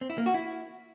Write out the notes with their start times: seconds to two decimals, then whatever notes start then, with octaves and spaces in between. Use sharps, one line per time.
0.01 C4
0.10 E4
0.18 A#3
0.26 F#4
0.34 E4